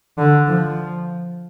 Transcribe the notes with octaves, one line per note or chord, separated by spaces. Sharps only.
D3
F3